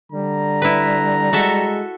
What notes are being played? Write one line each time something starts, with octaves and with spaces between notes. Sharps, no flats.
D3 G3 A#5
E4 B4
G#3 F#4 A4 E5